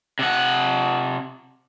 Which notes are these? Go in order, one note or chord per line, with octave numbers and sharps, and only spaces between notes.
C3 F#5